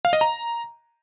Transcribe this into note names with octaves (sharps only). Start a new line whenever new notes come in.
F5
D#5
A#5